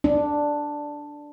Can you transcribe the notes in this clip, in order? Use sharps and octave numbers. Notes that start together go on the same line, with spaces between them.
D4